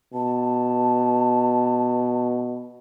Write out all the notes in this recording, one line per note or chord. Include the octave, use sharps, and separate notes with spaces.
B2 A5